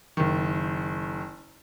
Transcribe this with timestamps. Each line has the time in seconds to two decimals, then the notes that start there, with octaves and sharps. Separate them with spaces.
0.17 F#1 D#3